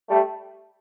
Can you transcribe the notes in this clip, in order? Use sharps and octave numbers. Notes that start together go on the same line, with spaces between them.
G3 A3